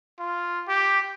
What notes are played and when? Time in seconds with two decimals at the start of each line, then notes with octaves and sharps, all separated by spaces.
0.19 F4
0.68 G4